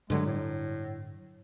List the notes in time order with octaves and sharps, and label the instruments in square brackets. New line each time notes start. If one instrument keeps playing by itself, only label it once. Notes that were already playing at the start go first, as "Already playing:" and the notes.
[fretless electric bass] G2 D3 F#3 [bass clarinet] G#3
[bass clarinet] A2